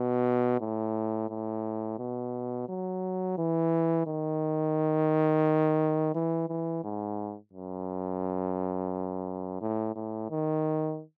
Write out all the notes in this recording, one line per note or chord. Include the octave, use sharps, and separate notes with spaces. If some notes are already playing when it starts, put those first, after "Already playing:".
Already playing: B2
A2
A2
B2
F#3
E3
D#3
E3
E3
G#2
F#2
A2
A2
D#3